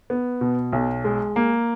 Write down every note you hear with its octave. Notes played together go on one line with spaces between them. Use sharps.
B3
B2
B1
G#3
A#3